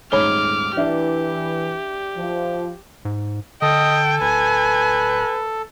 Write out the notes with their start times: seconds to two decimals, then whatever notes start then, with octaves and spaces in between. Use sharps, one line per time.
0.12 D#1 G#2 A3 C#5 B5 D6 F6 G7
0.77 E3 D4 G4 D5 E5
2.17 F3
3.05 G#2
3.62 D3 A4 D#5 G5
4.21 D1 B4 G#5